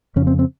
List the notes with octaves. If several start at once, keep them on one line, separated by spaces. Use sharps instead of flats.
F2 C#3 C#4
C4
C4